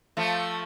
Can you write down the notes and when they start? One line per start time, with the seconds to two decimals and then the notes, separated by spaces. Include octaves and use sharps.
0.17 F3 A3